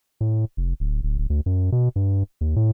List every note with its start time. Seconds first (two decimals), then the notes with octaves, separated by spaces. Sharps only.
0.21 A2
0.57 F1
0.80 D1
1.03 D1
1.18 D1
1.30 D2
1.46 F#2
1.72 B2
1.96 G2
2.41 D#2
2.56 A2